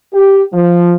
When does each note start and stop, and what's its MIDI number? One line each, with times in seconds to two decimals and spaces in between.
0.13 0.43 67
0.53 0.94 53